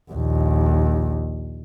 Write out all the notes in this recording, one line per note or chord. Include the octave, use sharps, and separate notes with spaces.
A#1 D#2